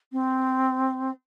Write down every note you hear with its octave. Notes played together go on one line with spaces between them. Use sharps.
C4